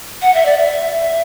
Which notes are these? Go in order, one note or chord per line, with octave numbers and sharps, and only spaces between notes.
F#5
E5
D5
E5